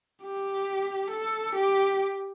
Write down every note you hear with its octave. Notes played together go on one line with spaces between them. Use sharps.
G4
A4
G4